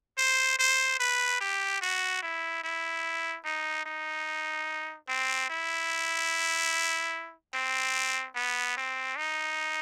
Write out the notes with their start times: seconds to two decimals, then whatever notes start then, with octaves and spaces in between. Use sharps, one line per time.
0.18 C5
0.59 C5
0.99 B4
1.40 G4
1.81 F#4
2.22 E4
2.63 E4
3.45 D#4
3.86 D#4
5.08 C4
5.50 E4
7.54 C4
8.36 B3
8.77 C4
9.17 D#4